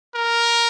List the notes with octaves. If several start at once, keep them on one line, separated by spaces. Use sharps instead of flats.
A#4